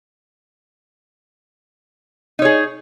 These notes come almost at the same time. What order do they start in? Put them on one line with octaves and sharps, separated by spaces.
D#4 C#5 G#4